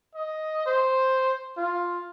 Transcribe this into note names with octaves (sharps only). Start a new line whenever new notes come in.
D#5
C5
F4